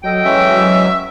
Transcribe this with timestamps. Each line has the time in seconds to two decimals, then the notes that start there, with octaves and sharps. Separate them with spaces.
0.04 F#3 A4 D#5 G5
0.25 E3 G#3 C#4 E5